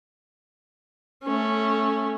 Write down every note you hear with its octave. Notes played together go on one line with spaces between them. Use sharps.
A3 C#4